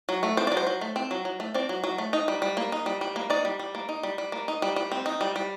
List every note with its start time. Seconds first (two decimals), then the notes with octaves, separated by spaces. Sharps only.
0.09 F#3
0.23 A3
0.37 C4 C5
0.47 D5
0.52 F#3
0.57 C5
0.67 F#3
0.81 A3
0.96 C4
1.11 F#3
1.25 F#3
1.40 A3
1.54 C4 D5
1.69 F#3
1.84 F#3
1.98 A3
2.13 D#4
2.28 G3
2.42 G3
2.57 A#3
2.72 D#4
2.86 G3
3.01 G3
3.16 A#3
3.30 D#4 D5
3.45 G3
3.59 G3
3.75 A#3
3.89 D#4
4.03 G3
4.18 G3
4.32 A#3
4.48 D#4
4.62 G3
4.76 G3
4.92 C4
5.06 D#4
5.21 G3
5.36 G3